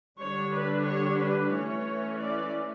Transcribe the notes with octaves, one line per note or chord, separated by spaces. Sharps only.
D3 G3 D4 C#5
B4
C#5
B4
E3 A3 C#4 C#5
D5